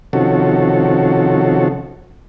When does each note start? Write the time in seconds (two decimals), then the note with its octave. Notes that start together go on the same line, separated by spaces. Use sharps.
0.13 C3 D#3 F3 C#4 F#4 A4